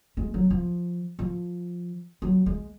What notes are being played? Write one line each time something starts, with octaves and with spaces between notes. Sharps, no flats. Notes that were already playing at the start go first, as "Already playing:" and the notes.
G#3
F#3
F3
F3
F#3
G#3